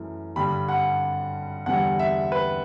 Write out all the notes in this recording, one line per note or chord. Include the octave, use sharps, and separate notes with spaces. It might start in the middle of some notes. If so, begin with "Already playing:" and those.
Already playing: F#2 E3 A3
G2 D3 G3 B5
F#5
E2 D3 G3 F#5
E5
B4